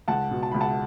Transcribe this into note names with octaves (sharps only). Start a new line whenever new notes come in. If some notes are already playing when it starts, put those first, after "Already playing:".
C#2 F#5 A5
B2
A5
C#2 B5
F#5 A5